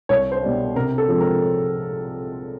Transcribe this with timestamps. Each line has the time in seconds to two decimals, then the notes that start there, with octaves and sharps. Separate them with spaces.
0.09 C2 C#5
0.32 C5
0.43 B2 G3
0.76 C3 A#4
0.98 A4
1.08 F3 G#3 C4
1.20 A#4